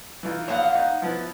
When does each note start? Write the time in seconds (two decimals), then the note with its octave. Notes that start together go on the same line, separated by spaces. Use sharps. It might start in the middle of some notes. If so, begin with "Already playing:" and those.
0.23 E3 D#4 F4
0.48 A#1 C#5 F5 F#5
0.75 D#4
1.02 F3 B3 E4